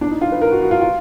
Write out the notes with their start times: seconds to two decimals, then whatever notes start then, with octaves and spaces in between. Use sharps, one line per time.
0.01 D4
0.11 D#4
0.22 F4
0.32 B4
0.42 A#4
0.51 F#4
0.62 F#4
0.71 F4
0.81 F4